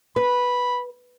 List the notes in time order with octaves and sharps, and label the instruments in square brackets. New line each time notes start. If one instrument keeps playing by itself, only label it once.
[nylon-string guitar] B4 [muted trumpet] B5